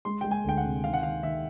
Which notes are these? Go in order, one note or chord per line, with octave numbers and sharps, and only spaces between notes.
G#3 C6
G#3 G5
G#5
D2 G5
F#5
C3
D#3 F5
F#5
D#3 F5
D#3 E5